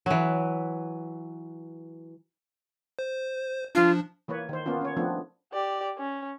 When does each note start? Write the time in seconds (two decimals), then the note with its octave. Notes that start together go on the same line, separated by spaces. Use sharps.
0.06 E3 F#3
2.99 C5
3.75 F3 D4 F4
4.28 E3 A#3 B4 C#5
4.49 D#3 C5
4.66 A#3 B3 C#4 F4
4.81 C#4 C#5
4.97 F3 A3 B3 C4 D4
5.53 G4 D5
5.98 C#4